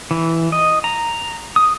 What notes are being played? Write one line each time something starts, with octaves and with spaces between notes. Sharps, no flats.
E3
D#5
A#5
D#6